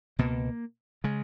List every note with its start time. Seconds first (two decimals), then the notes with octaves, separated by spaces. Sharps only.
0.19 C#2 B2 A#3
1.04 C#3 G#3